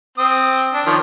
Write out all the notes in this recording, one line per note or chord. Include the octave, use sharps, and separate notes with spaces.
C4 D#6
D4
D#3 F3 C#5